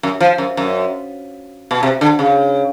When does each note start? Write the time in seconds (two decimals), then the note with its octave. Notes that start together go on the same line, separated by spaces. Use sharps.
0.03 F#2
0.20 F3
0.38 F#2
0.57 F#2
1.71 B2
1.83 C3
2.01 D3
2.19 C#3